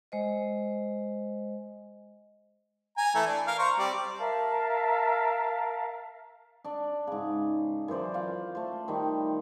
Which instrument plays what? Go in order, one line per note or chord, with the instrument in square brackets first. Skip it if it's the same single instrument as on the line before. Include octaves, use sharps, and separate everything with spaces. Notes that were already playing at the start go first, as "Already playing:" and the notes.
[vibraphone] G#3 C5 D#5
[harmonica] G#5 A#5
E3 A3
D4
A#4 F5
C5 A#5 C#6
G3 C4 D5
[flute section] A#4 E5 F5 A5
[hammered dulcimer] D4 D5
G#2 C#3
F#2 E3 C5 D5
F4 F5
A3 C5
D#3 G3